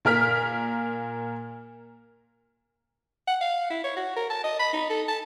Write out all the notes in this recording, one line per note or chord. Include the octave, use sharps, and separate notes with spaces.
A#2 A#4 F6 B6
F#5
F5
E4
C#5
F#4
A#4
A5
D#5
B5
D#4
A4
A5